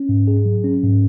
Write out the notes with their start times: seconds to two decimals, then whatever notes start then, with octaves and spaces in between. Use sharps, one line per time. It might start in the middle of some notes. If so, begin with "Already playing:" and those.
Already playing: C#4
0.09 G#2
0.27 G#4
0.45 F#3
0.64 C#4
0.83 G#2